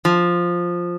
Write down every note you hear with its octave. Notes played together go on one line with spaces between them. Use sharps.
F3